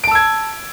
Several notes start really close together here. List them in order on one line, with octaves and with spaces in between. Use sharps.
D7 A5 E6 G#6